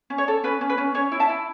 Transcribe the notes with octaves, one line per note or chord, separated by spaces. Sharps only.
C#4
C#5
A4
C#4 B4
C#4
B4
C#4
C#4 C#5
E4
E5 A5
E4